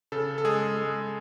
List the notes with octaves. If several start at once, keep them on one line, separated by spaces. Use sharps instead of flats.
C#3 A4
A4
G#3 G#4
G#3